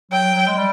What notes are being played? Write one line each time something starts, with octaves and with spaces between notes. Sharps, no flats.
F#3 G5
F#3
G#3
G3